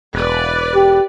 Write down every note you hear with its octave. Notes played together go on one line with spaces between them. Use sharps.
E1 B4 D5
G4